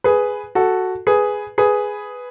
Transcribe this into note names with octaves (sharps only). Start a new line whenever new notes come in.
G#4 B4
F#4 A4
G#4 B4
G#4 B4